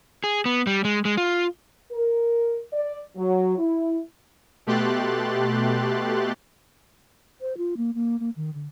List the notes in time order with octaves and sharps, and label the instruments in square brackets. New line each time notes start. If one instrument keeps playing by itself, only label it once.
[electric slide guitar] G#4
B3
G3
G#3
G#3
F4
[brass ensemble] A#4
D5
F#3
E4
[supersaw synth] B2 A3 G4 C6 F#6 A6
[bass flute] C5
F4
A#3
A#3
A#3
D#3
D3